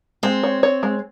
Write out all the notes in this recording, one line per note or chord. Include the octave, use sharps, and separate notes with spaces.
G#3 C4
C#5
C#5
G#3